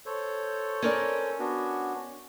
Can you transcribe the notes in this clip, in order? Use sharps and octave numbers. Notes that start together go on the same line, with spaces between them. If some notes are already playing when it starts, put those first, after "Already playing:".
A4 C5 C#5
C#4 A#4 D5
B3 D4 F#4